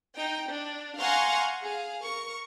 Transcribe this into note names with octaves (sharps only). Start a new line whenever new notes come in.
D#4 G5
D4
F5 F#5 G#5 A#5 C6 C#6
G#4 F5
A#4 C#6